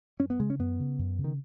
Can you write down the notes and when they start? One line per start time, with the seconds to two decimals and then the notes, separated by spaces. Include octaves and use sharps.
0.20 F#2 C#4
0.30 B3
0.40 C#3 G#3
0.50 C#4
0.59 F#2 B3
0.79 C#3
0.99 F#2
1.18 C#3
1.24 D#3